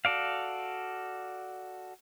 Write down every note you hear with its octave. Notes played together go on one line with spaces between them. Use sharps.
F#4 A4 D5 F5